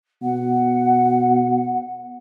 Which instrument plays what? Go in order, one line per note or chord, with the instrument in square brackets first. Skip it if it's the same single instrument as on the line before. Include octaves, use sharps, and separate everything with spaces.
[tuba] B2 [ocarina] F#5